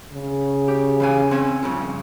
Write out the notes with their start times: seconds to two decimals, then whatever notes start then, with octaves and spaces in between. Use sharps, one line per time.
0.12 C#3
0.68 G4
1.00 E3 F5 G#5
1.31 C4 G#5
1.63 G2 C#3 F3